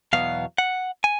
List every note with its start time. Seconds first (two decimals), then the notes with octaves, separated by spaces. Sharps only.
0.13 E2 B2 F#3 B3 F5
0.58 F#5
1.04 G#5